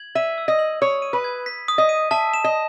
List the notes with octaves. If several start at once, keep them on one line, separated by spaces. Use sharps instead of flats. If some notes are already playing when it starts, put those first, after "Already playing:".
Already playing: G#6 F#7
E5 D#7
E6
D#5
F#7
C#5 D#6
D#7
B4
G#6
B6
D#6
D#5
D#7
E5 A5
E7
D#5